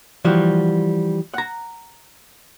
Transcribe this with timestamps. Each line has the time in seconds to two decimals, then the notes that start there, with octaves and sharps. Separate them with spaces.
0.25 E3 F3 G3 F#4
1.34 F#5 A#5